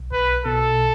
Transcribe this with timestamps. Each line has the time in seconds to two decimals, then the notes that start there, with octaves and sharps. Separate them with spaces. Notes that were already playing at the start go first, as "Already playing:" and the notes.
Already playing: B1
0.12 B1 B4
0.46 B2 A4